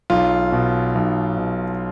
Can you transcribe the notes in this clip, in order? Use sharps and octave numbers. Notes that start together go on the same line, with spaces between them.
B1 F4
B2
B1
B2